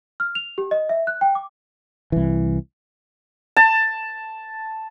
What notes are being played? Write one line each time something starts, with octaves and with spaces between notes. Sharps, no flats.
F6
F7
G4
D#5
E5
F#6
G5
D6
C2 E3
A5